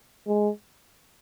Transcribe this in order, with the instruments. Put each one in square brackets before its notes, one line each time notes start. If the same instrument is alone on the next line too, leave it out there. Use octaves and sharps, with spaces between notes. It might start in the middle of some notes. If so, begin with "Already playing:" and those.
[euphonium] G#3